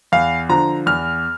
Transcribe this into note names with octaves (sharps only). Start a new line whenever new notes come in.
E2 F5
D3 F3 A#5
E2 F6